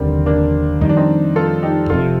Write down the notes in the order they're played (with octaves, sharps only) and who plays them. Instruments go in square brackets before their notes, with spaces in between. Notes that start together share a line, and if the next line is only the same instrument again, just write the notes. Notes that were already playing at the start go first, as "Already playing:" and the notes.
Already playing: [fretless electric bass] F1 D#2 D3 [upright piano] G3 A#3 C4
[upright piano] A#3 D4
[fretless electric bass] F2 D#3 G3 [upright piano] D#4
[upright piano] D4
C4 D#4
F4 A4
D#4 G4
[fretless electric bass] F1 F2 C3 [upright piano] F4 A4